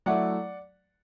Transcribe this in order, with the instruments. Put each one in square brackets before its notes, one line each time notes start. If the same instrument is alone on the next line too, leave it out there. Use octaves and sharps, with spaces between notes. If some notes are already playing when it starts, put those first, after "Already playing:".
[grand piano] F#3 A3 E4 D5 F#5